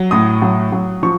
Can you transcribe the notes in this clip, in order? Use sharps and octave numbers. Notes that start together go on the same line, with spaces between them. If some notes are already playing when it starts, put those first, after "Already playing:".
Already playing: F#3
A2 D#6
F#3
F#3
F3 C#6